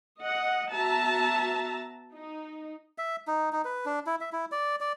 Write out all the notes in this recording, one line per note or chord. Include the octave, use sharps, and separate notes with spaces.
D#5 F#5
B3 F#4 E5 A5 A#5
D#4
E5
D#4
D#4
B4
D4
E4
E5
E4
D5
D5